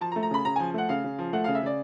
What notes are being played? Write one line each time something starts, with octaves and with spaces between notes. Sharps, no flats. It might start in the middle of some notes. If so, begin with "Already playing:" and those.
F3 A5
A#5
A3
A#5
C#3 B5
C#3 A#5
F3 G#5
A3 F#5
C#3 F5
C#3
F3
A3 F#5
C#3 F5
E5
C#3 D5